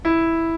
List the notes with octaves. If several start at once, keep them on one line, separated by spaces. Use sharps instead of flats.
E4